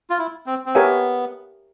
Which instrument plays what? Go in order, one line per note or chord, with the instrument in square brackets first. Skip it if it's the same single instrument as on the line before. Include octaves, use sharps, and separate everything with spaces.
[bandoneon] F4
E4
C4
C4
[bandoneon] B3 [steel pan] G4 A#4 C#5 E5 G#5